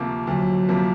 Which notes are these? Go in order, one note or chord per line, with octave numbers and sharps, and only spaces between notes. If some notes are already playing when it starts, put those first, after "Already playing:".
Already playing: D2 C3 F3 A#3
D2 F#3
C3 F3 A#3